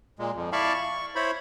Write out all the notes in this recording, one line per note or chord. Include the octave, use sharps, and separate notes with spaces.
A#2 G#3
F2
E4 D5 F5 A5 B5 C#6
C#6
E4 C5 C#5 B5